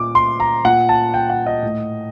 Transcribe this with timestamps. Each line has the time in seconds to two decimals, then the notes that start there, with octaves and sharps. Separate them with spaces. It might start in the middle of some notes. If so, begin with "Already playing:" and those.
Already playing: A#2 D6
0.15 C6
0.40 A#5
0.65 A#2 F#5
0.89 A5
1.14 G5
1.30 F#5
1.46 D#5
1.63 A2